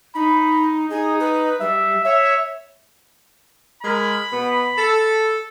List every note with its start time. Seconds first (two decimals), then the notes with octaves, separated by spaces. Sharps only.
0.15 D#4 B5
0.90 D#4 G#4
1.20 B4
1.60 G3 E5
2.05 C#5 E5
3.83 G#3 A#4 B5
4.31 B2 B3
4.77 A4